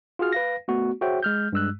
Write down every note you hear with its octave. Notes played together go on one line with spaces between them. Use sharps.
F4 F#4 G#4 F6
B4 F5 A#6
A3 B3 F#4
F#4 G#4 C5 C#5 E5 G5
G#3 F6 G6
G2 G#3 E6 F#6